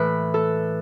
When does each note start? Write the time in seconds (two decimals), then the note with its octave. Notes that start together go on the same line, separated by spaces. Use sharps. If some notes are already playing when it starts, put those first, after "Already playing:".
Already playing: A2 E3 B4
0.34 A4